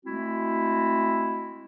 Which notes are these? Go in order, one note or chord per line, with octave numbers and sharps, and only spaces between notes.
G#3 A3 C4 E4 F#4